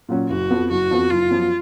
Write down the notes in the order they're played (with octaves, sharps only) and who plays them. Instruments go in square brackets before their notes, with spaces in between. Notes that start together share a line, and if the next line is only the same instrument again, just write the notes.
[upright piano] A#2 F#3 C#4 F#4
[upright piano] F#1 [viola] F#4
[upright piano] F2 F3 B3
[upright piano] F#1 [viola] F#4
[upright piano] F2 F3 B3
[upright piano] F#1 [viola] F4
[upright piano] F#2 F3 B3